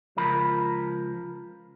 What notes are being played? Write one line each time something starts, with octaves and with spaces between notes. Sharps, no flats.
C#2 F3 A#4 B5